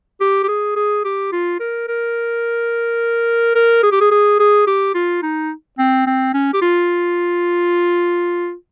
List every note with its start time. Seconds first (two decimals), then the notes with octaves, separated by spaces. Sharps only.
0.20 G4
0.43 G4
0.48 G#4
0.76 G#4
1.05 G4
1.32 F4
1.60 A#4
1.88 A#4
3.55 A#4
3.83 G#4
3.92 G4
4.01 G#4
4.11 G#4
4.39 G#4
4.67 G4
4.95 F4
5.22 D#4
5.78 C4
6.07 C4
6.34 C#4
6.53 G4
6.62 F4